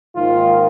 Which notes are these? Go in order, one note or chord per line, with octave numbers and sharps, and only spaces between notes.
G#2 D#3 A#3 F4